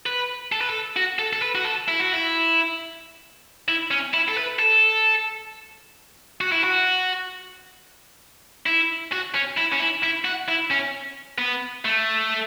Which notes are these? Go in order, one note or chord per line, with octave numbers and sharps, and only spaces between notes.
B4
A4
B4
A4
F#4
A4
A4
B4
F#4
A4
E4
F#4
E4
E4
C#4
E4
A4
B4
A4
F#4
E4
F#4
E4
F#4
C#4
E4
C#4
E4
E4
F#4
E4
C#4
B3
A3